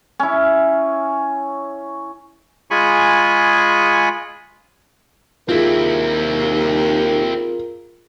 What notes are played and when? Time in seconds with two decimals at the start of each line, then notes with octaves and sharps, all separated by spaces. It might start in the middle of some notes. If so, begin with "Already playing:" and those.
0.20 C#4 E4
2.71 G#3 F4 G#4 G#5 B5 C#6
5.49 D#2 C4 E4 F4 G#4 A#4